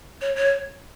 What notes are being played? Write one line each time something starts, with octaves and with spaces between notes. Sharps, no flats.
C#5
C#5